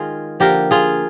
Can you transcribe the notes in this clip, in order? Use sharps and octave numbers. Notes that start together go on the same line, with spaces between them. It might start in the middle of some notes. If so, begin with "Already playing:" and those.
Already playing: D#3 G#3 F4 G#4
D3 F3 A#3 G4 A#4
F4 G#4